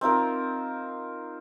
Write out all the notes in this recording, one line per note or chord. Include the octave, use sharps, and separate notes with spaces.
C4 D#4 F4 A#4